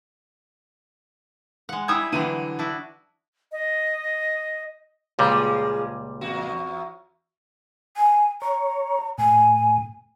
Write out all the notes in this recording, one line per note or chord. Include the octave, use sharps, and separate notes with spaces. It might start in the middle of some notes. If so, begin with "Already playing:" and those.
G#3 F#5
G3 E4 E5 D#6 G#6
D3 E3 F#3 G3 D#7
D4 E4 F#4
D#5
C#2 A#2 F3 G3 G#3
E2 F#4
G#5
C#5 A#5
A2 G#5